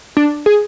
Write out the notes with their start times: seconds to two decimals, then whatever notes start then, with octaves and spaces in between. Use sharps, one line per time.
0.17 D4
0.46 G#4